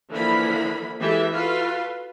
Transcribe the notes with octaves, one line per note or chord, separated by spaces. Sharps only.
D3 E3 F3 A#3 E4 B5
E3 G#3 G4 A4 E5
F4 F#4 A4 B4 F5